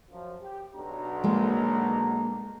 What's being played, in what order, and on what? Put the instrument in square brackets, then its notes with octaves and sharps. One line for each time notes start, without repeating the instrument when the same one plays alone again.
[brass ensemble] F#2 F3
G4
B1 D4 A#5
[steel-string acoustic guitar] G#3 A#3